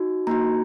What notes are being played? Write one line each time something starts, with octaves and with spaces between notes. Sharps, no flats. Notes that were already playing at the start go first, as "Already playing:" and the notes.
Already playing: D#4 F#4
A#3 D#4 F#4 A#5